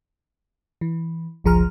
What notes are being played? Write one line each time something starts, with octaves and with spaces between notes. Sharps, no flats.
E3
G1 C#2 F3 G#4 A#5 F6